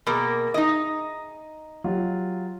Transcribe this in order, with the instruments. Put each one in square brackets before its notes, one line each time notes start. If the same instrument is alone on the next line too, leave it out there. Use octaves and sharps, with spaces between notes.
[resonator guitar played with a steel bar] B2 A#3 [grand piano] G#4
[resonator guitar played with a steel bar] D#4 D#5
[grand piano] F#3 F4 G4